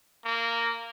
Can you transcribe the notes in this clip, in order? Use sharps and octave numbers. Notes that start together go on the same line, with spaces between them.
A#3